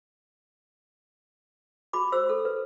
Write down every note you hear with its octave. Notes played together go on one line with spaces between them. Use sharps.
F#4 B5 D6
F#4 C5 E6
A4
B4